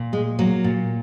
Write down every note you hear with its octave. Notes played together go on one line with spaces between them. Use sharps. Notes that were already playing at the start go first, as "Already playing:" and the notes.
Already playing: A#2
G#3
F#3 A#3
A#2